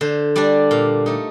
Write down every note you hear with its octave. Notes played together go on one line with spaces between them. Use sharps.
D3 C5
G3 D4 D5
A#2 F5
A3 D#4